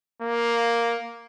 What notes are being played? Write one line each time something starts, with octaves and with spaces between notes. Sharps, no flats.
A#3